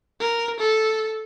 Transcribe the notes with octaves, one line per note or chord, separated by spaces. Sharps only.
A#4
A4